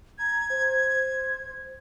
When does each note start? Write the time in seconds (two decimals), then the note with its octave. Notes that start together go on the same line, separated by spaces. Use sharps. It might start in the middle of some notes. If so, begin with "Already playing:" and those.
0.19 A#5 G#6
0.50 C5